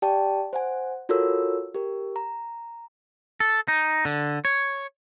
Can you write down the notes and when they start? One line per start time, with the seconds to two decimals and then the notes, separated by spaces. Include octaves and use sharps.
0.02 G4 D5 G5 A5
0.53 C5 F#5 G#5
1.09 F4 F#4 A4 A#4 C#5 E6
1.74 G4 A#4
2.16 A#5
3.40 A4
3.68 D#4
4.05 D3
4.45 C#5